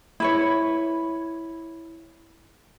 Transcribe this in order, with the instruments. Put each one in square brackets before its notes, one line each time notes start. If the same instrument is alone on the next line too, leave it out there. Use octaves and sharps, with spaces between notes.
[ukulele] E4 B4 C#5